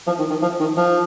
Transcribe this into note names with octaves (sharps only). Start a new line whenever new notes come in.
F3
D#3
D#3
F3
D#3
F3